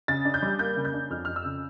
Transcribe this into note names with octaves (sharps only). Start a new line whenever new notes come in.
C#3 A6
D4
G6
G3
A#3 G6
C#3
G6
D4
F2 F6
F2 F6
E6
C#3